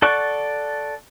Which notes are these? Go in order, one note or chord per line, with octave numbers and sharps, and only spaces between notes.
A4 D5 F#5 C#6